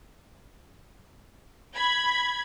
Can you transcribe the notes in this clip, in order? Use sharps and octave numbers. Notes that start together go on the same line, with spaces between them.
B5 G#6